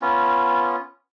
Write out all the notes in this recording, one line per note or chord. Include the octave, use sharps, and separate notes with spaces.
B3 C#4 F4